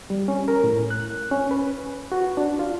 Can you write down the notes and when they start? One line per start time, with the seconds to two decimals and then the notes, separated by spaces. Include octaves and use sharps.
0.10 G3
0.28 C#4
0.48 A#4
0.64 A2
0.90 F#6
1.31 C#4
1.51 B4
2.12 F#4
2.37 D4
2.59 F4